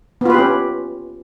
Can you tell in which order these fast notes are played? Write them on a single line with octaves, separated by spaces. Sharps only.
B3 F4 B4 G4 C#4